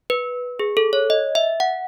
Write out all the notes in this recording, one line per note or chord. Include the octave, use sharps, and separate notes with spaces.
B4
G#4
A4
C#5
D#5
E5
F#5